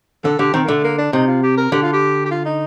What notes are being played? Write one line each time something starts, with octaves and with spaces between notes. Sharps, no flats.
D3 A4
D3 G4
D#3 C4
A#3
D3 A3
A#3
D4
C3 D#4
F4
G4
A#4
D3 G4
F4
G4
G4
F4
D#4